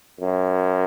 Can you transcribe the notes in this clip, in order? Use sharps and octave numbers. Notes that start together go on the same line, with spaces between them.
F#2